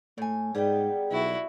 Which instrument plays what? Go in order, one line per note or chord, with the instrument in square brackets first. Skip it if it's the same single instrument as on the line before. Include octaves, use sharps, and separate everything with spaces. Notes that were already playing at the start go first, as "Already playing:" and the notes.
[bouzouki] A2 G#5 [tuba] A3
[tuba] G#2 [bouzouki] G3 B3 D#4 [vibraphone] G#4 G5
[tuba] B1 [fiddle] E4 F#4